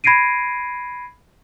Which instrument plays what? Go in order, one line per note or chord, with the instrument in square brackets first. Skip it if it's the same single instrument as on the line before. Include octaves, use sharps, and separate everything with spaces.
[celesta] B5 G#6 A#6 C7 D7 D#7